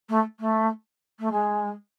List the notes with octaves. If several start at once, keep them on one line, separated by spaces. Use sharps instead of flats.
A3
A3
A3
G#3